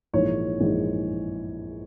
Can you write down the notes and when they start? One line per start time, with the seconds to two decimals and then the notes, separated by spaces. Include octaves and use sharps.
0.13 A#1 G#2 E3 G#3 C#5
0.60 A#1 G#2 E3 G#3